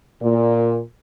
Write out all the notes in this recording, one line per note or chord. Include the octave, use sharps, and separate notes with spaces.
A#2